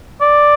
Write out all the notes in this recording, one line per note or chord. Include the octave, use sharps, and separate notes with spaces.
D5